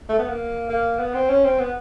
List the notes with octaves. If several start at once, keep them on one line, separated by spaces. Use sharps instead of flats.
A3
B3
A#3
A#3
B3
C4
C#4
C4
B3